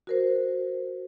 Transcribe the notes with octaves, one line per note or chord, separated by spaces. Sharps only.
F#4 A#4 C5